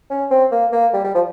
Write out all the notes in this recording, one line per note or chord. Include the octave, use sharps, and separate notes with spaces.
C#4
C4
A#3
A#3
G3
G3
F3